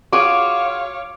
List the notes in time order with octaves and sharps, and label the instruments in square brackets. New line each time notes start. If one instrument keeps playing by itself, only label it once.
[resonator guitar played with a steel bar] F4 F#4 G#4 [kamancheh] C#5 F5 [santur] D6